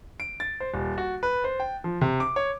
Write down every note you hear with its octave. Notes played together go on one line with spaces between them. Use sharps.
D7
A6
C5
D#1
F#4
B4
C5
G5
F3
C3
D6
C#5